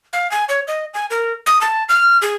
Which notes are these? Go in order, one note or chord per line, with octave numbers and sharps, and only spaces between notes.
F5
G#5
C#5
D#5
G#5
A#4
D#6
A5
F6
G#4